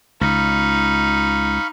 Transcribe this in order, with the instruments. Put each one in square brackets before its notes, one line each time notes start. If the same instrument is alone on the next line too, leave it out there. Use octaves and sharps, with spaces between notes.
[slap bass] C#2 [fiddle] D#4 [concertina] F5 B5 C#6